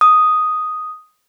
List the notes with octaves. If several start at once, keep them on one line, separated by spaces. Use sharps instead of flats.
D#6